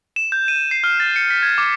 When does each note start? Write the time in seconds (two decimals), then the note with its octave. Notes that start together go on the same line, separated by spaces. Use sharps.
0.16 E7
0.32 G6
0.48 D#7
0.71 C7
0.84 F6
1.00 A6
1.16 C#7
1.30 B6
1.43 G#6
1.58 D6